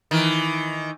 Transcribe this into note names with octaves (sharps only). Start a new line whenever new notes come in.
D#3 E3